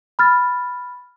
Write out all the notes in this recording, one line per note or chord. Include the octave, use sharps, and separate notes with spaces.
B5 F6 A6